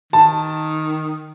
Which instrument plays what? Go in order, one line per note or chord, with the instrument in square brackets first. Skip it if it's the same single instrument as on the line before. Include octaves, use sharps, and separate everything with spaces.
[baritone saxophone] D#3 [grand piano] A5